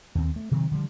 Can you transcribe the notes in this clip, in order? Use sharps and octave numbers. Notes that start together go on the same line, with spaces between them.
D#2 C4
A3
C3 D#3 F#3 C4
D3 F3 G3